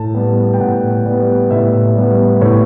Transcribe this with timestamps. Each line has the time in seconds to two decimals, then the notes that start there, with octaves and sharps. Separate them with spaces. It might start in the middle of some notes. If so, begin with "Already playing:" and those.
Already playing: A2 A5
0.15 G3 B3
0.53 G5
0.60 A2 F#5
1.05 G3 B3
1.51 A2 E5
1.96 G3 B3
2.41 A2 C#5